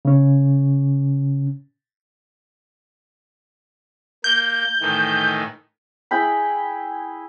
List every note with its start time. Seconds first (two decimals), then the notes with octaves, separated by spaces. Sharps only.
0.05 C#3 C#4
4.24 A#3 G6
4.81 A2 D#3 E3
6.11 E4 G#4 G5 B5